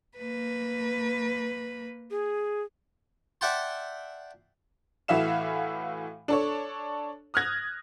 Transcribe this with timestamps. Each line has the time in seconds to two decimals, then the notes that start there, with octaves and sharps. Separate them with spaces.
0.17 A#3 B4
2.11 G#4
3.41 D5 E5 F#5 G5 A5 C6
5.08 A2 E3 F#4 E5 F5 E7
6.28 D4 A4 C#5
7.34 D#6 F6 F#6 G#6 A#6